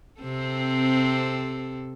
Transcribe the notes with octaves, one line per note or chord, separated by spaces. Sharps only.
C3 C4 A4